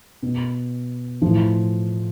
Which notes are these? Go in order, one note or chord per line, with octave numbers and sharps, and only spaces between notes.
B2
A2 E3 F3